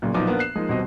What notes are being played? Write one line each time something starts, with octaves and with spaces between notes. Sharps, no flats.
B1 A#2 C#3
B1 A#2 F3 B3 D#4 D6
A#3 B3 D4 B4 C5
F#6 C7 E7
F3 G#3 A#3 D#4
D#1 B2 C4 D#5